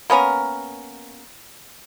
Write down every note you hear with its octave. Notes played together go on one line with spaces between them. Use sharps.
A#3 B3 C#4 A#4